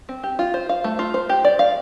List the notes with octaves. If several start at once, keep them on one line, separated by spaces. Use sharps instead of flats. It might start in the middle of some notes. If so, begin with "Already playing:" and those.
C4
G4
F4
C5
F5
A3
F4
C5
G4
D5
F5